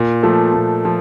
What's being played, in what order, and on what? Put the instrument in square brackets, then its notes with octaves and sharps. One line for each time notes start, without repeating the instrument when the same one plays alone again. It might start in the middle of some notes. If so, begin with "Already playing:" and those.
Already playing: [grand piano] A#2
F3 A3
A#2
F3